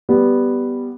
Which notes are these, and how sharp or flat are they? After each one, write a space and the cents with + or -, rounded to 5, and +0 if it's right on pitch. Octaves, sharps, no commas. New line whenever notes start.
G3 +0 B3 +0